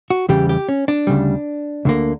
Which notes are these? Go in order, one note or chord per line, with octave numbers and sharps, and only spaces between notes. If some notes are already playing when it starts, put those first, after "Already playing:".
F#4
E2 C#3 E3 G3 G4
G4
C#4
D4
D2 C#3 G3
D2 D3 A#3